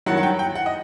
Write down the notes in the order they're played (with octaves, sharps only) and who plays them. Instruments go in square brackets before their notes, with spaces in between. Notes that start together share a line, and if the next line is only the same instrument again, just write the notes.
[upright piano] G2 D#3 F#3 F#5
F#5
G5
G5
F#5
D#5